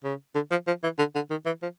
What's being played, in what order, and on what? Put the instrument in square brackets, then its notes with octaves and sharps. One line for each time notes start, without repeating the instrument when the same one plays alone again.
[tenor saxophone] C#3
D3
F3
F3
E3
D3
D3
D#3
E3
F3